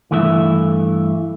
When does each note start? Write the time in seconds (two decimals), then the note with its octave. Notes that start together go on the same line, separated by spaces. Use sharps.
0.11 G2 E3 A3 E4 A#4 E5